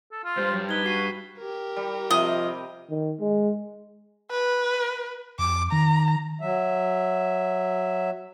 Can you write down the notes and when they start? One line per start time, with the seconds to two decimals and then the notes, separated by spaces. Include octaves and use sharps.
0.12 A4
0.24 F4
0.37 G2 G3 C5
0.53 F#3
0.69 D#4 B4 G#6 G7
0.85 F#4 C#6 C7 D#7
1.38 G4 A#4
1.76 G3
2.11 C3 F3 D#5
2.90 D#3
3.20 G#3
4.31 B4
5.39 F2 D6
5.72 D#3 A#5
6.41 F#3 E5